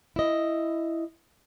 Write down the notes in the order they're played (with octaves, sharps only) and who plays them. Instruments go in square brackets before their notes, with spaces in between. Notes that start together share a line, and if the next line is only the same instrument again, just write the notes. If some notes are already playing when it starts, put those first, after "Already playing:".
[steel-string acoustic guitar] E4 D#5